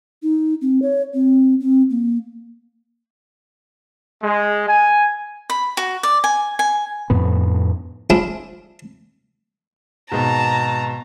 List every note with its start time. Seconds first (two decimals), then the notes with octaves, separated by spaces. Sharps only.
0.23 D#4
0.61 C4
0.82 C#5
1.14 C4
1.60 C4
1.90 A#3
4.23 G#3
4.67 G#5
5.50 B5
5.77 F#4
6.03 D5
6.24 G#5
6.59 G#5
7.10 F2 A2 B3
8.10 D4 E4 F4 G#4 C5
10.12 G#1 B2 A5 A#5